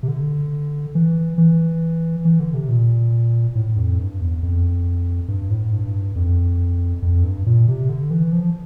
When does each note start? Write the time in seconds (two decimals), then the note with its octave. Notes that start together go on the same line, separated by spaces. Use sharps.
0.03 C3
0.08 D3
0.95 E3
1.38 E3
2.25 E3
2.40 D3
2.54 C3
2.69 A#2
3.55 A2
3.76 F2
3.98 G2
4.21 E2
4.43 F2
5.28 G2
5.50 A2
5.72 G2
6.15 F2
7.02 F2
7.23 G2
7.46 A#2
7.68 C3
7.89 D3
8.11 E3
8.32 F3